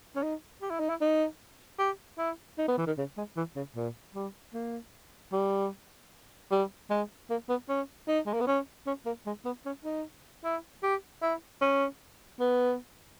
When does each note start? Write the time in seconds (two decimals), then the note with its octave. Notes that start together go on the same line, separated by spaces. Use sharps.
0.16 C#4
0.22 D#4
0.61 G4
0.70 E4
0.80 D#4
0.89 E4
1.01 D#4
1.79 G4
2.18 E4
2.58 D#4
2.68 B3
2.77 E3
2.87 D#3
2.98 C#3
3.17 G#3
3.36 E3
3.56 C#3
3.76 A#2
4.15 G3
4.54 A#3
5.32 G3
6.51 G3
6.90 G#3
7.30 A#3
7.49 B3
7.69 C#4
8.08 D#4
8.26 G#3
8.34 A#3
8.40 B3
8.47 C#4
8.86 C#4
9.06 A#3
9.26 G#3
9.45 B3
9.66 C#4
9.84 D#4
10.44 E4
10.83 G4
11.22 E4
11.61 C#4
12.40 B3